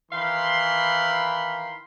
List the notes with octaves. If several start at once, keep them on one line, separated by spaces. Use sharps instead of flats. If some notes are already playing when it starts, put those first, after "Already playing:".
D#3 E3 F5 B5 C6